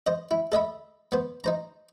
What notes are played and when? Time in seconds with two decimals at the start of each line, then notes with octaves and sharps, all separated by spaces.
0.07 C5 D#5
0.31 E4
0.52 A4 D#5 E5 B5
1.12 B3 C5
1.44 D#4 C5 A#5